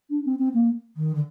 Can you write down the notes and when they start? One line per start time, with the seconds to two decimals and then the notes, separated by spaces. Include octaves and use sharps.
0.10 D4
0.25 C4
0.39 C4
0.54 A#3
0.97 D#3
1.15 D3